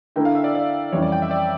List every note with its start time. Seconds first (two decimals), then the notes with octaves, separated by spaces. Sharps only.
0.16 D3 A3 E4 A#4 G5
0.25 F5
0.35 E5
0.44 D5
0.55 D5
0.92 F2 E3 G3 C#4 C#5
1.02 D5
1.12 G5
1.22 E5
1.31 D5